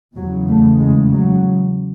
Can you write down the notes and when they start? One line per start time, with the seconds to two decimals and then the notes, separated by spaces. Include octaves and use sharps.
0.16 E2 C#3 F#3
0.48 A3
0.79 G#3
1.11 F#3